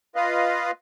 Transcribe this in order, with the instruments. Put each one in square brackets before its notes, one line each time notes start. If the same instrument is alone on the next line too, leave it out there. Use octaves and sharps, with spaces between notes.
[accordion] F4 B4 D#5 F5